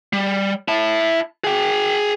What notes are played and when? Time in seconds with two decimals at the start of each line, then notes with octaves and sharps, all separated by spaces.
0.13 G3
0.68 E4 A5
1.44 G#4 G5